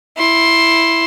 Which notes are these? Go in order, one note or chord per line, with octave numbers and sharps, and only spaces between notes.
E4 C6